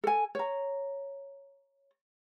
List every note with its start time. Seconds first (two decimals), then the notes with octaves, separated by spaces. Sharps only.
0.04 A4 G#5
0.35 C#5 A#5